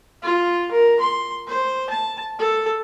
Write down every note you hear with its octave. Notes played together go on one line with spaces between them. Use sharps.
F4
A#4
C6
C5
A5
A4